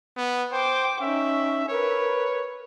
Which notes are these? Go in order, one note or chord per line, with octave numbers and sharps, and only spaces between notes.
B3
C5 G5 D6
C#4 D#4 E5
A#4 B4 C#5